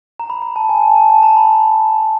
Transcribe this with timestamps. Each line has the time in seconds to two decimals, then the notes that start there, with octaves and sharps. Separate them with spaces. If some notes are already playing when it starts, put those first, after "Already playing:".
0.20 A#5
0.30 B5
0.42 A#5
0.56 A5
0.69 G#5
0.82 A5
0.97 A5
1.10 A5
1.23 A#5
1.37 B5